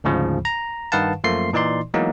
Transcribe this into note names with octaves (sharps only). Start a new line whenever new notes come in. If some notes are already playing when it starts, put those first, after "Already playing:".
D2 G#2 C#3 F3
A#5
G2 D#3 B4 F5 F#5 A5
F#2 F3 A3 A#3 C6 C7
A#2 E3 D#4 D5 C6
E3 F#3 G#3 A#3 B3 D#4